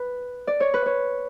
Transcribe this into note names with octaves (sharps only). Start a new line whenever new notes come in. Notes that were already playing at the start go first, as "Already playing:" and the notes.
Already playing: B4
D5
C#5
B4
C#5